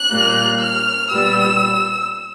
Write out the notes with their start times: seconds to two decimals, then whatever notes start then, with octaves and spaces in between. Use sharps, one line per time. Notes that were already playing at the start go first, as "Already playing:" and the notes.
Already playing: F#6
0.10 A#2 G3 A#3
0.60 F6
1.11 A#2 G3 B3 E6